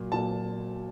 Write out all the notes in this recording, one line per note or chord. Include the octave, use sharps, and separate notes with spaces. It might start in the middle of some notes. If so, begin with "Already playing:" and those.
Already playing: A#2 F#3
A#2 F#3 A5